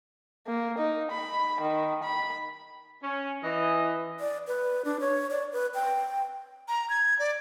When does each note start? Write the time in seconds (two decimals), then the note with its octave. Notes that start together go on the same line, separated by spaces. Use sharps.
0.47 A#3
0.78 D#4
1.11 B5
1.61 D#3
2.04 B5
3.03 C#4
3.43 E3 D#5
4.20 D5
4.47 B4
4.85 D4
5.00 C#5
5.31 D5
5.53 B4
5.75 G5
6.68 A#5
6.90 G#6
7.19 D5